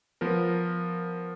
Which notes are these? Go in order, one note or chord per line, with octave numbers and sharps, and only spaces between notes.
F3 B3 A#4